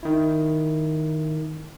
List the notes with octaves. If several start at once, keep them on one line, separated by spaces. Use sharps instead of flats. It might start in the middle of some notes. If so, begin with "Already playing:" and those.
D#3 E4